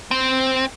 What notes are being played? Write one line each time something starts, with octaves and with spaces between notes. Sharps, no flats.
C4